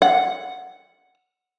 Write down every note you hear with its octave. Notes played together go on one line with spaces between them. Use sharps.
F#5